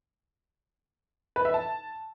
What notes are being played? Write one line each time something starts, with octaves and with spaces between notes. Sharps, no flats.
B4
E5
A5